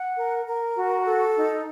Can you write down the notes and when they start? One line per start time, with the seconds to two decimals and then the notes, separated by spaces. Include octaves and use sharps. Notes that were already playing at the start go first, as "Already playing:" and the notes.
Already playing: F#5
0.17 A#4
0.46 A#4
0.77 F#4
1.06 A4
1.36 D#4